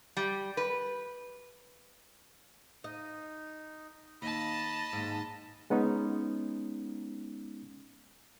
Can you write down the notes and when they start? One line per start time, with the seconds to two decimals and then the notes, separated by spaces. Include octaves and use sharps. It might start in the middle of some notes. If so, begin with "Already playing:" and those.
0.17 G3
0.57 B4
2.84 D#4 D#5
4.22 D#2 D#5 A5 B5
4.93 D#2 G#2
5.70 G#3 B3 C#4 D#4